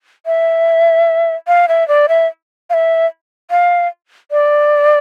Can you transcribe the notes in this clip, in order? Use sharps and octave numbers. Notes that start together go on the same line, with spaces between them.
E5
F5
E5
D5
E5
F5
E5
F5
D5